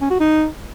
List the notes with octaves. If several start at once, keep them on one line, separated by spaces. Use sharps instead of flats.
C#4
F#4
D#4